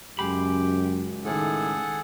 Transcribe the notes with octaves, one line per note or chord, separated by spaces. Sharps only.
C#2 F#2 G#3 G4 B5
A2 D#3 G#4 A4 F#5